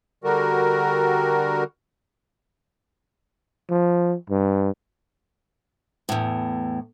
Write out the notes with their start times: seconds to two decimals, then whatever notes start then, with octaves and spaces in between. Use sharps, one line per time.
0.24 D3 G3 F#4 A#4
3.70 F3
4.30 G2
6.09 E2 A2